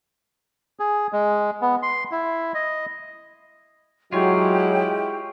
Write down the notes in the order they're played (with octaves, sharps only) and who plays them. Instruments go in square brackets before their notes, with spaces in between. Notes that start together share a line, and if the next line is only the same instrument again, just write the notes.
[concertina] G#4
G#3
B3
C6
E4
D#5
[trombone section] F#3 [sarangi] G#3 [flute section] E4 G4 G5 [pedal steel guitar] F4 C#5